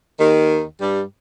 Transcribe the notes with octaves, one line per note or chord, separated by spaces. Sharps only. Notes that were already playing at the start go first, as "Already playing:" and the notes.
D#2 D#3
G2 G3